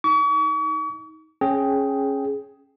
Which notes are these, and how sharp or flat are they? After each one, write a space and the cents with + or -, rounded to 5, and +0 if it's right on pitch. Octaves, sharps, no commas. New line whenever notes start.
D#4 +25 C#6 +40
C#4 -15 G#4 +10 G5 +0